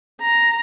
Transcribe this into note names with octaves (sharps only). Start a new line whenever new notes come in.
A#5